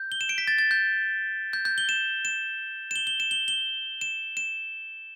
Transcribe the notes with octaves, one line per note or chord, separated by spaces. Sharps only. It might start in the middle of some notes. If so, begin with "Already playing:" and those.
Already playing: G6
G7
E7
D7
B6
A6
A6
G6
G6
G6
G7
E7
E7
E7
G7
G7
E7
G7
G7
E7
E7